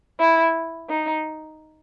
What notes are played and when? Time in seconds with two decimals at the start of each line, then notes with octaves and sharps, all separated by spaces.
0.19 E4
0.89 D#4